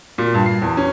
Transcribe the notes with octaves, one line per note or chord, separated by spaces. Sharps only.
A#2
G2
C7
E2
C#4